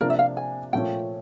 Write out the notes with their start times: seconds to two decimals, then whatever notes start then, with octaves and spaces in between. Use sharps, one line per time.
0.01 C3 F3 A#3 D4 F4 A#4
0.10 E5
0.19 F5
0.37 G#5
0.73 A#2 F3 A3 C#4 G5